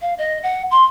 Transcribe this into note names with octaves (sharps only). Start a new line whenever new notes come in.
F5
D#5
F#5
C6